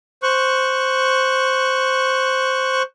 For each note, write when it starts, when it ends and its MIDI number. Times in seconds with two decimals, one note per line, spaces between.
0.23 2.82 72
0.23 2.82 85
0.23 2.82 90